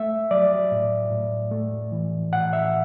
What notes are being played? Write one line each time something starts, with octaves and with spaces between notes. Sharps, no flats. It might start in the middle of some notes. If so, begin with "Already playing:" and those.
Already playing: A3 E5
F#3 D5
A2
A2
A3
E3
A2 F#5
E5